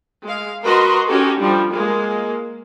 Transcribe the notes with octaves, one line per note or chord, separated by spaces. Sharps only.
G#3 F5
F#4 A#4 B4 D#5 A#5 C6
C#4 D#4 F#4 G4 A4
F3 G3 D4
G#3 A#3 F4